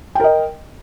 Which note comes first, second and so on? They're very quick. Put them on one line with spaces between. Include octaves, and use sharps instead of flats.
G5 A#4 D#5